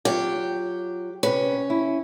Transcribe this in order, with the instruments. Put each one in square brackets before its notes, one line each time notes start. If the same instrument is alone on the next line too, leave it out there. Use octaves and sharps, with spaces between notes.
[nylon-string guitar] F#3 F4 C#5 [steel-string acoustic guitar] G4
[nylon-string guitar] C3 B4 [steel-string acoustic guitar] C#4
[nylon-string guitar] E4